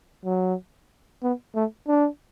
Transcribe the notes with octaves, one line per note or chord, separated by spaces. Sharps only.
F#3
B3
A3
D4